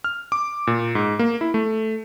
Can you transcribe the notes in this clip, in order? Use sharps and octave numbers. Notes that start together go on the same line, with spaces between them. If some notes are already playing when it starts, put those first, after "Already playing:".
F6
D6
A#2
G#2
A#3
E4
A3